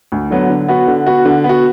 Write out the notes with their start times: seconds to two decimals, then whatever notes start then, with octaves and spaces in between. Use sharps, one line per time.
0.12 D2
0.31 D3 F#3 B3
0.50 D3
0.68 B3 F#4
0.88 D3
1.07 B3 F#4
1.25 D3
1.44 B3
1.49 F#4